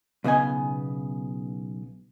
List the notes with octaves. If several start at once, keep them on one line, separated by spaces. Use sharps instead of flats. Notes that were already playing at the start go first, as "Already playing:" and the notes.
B1 C#3 B3 D#5 G#5